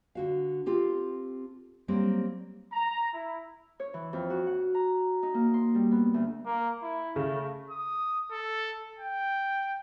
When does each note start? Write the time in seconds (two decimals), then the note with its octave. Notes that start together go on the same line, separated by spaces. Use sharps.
0.15 D3 F#4 F5
0.66 C4 F4 G4 A4
1.88 F#3 G3 A#3 C4
2.73 A#5
3.14 E4
3.80 C#5
3.94 E3
4.13 F2
4.30 F#4
4.47 F#5
4.74 A#5
5.23 D#4
5.34 A#3
5.54 C6
5.75 G3
5.91 B3
6.14 D2
6.45 A#3
6.82 E4
7.16 C#3 A3
7.70 D#6
8.32 A4
8.99 G5